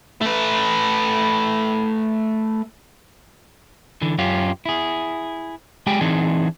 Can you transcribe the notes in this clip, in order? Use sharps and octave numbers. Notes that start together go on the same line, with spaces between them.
A3 B4
D3 E3
F#2 C#4 F4 G4
E4 G#4
G#3 G4 G#4 G5 G#5
E3 C4 D4 D#4 G#4